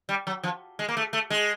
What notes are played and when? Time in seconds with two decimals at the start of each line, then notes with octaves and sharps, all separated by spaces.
0.09 G3
0.27 F#3
0.43 F3
0.79 G#3
0.88 A#3
0.97 A3
1.13 A3
1.30 G#3